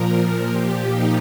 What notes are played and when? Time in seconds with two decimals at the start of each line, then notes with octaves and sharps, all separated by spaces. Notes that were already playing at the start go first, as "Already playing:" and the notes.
Already playing: A#2 F3 A#4
0.11 A#4
0.50 A#2 F3 G4
0.89 D#4